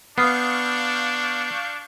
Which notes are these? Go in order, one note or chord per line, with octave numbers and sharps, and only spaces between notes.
B3 D4 F5 C#6 D#6 F6 G6 C7